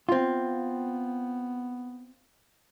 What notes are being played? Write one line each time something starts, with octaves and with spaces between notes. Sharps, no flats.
B3 C4 F4